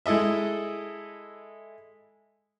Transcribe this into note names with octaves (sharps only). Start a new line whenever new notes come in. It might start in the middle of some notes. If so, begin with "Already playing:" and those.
G#3 E4 A4 D#5 E5